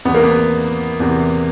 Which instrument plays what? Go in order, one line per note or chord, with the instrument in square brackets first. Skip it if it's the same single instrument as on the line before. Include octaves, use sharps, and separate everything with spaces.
[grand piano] E2 C3 E3 B3
A#3
B3
E2 C3 E3